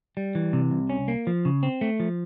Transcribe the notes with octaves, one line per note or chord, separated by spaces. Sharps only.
G3
E3
C3
C2
C#4
A#3
F3
C#3
C4
A3
F3